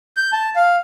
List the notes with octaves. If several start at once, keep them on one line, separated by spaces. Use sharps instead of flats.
G6
A5
F5